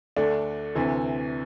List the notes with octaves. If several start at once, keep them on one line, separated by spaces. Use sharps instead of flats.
D2 D3 A3 D4
D2 C3 E3